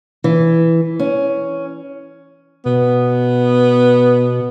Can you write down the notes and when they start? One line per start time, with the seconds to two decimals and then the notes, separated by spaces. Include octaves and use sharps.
0.24 E3
0.99 C#4
2.66 B2 B3